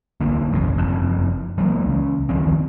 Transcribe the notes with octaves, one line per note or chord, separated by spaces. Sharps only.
D1 A1 D3 A#3
F#1 B1 E2 C#3
F#1 F2
E3 F#3 G#3 A#3
C#2 C#3
D2 D#3 F3 C4